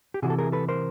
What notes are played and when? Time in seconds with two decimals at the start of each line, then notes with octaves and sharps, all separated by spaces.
0.14 G4
0.22 C3 E3 F#4 G#4
0.30 A4
0.38 G#4 A#4
0.52 A4 B4
0.68 A#4 C5